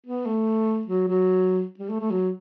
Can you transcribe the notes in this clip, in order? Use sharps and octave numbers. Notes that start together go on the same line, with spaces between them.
B3
A3
F#3
F#3
G3
A3
A3
F#3